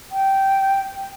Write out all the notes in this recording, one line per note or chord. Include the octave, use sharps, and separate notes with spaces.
G5